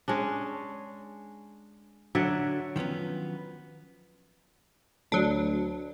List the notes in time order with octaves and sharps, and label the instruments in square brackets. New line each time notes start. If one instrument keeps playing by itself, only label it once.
[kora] G#3 C#4 D4
D3 F#3 D5 E5
[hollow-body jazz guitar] D#3 F3 F#3 B3 C#4
[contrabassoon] D2 [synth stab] F#3 D4